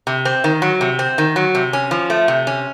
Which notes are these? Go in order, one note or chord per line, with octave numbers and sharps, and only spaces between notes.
C3
C4
D#3
F#3
C3
C4
D#3
F#3
C3
C#4
F3
A3
C3
C#4